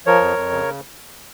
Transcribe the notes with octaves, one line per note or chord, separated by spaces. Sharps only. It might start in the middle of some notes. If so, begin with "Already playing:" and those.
F3 A#4 C#5
F2
F2
C#3